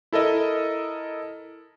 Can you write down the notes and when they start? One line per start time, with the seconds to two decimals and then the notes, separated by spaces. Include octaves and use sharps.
0.13 E4 A4 A#4 D#5